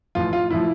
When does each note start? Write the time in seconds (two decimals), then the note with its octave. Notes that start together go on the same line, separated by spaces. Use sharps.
0.15 A1 A2 F3 F4
0.33 F4
0.51 A2 F3 E4